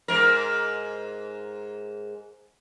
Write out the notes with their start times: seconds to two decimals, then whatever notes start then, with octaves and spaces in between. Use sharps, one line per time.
0.08 G#2 A#4